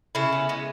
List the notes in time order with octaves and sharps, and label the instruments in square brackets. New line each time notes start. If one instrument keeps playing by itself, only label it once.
[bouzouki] C#3 E4
B3
G#3